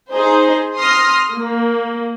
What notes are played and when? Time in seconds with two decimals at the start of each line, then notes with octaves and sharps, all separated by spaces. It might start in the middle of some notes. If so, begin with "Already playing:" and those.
0.13 D#4 G#4 C5
0.76 C6 D#6 F6 A#6
1.32 A#3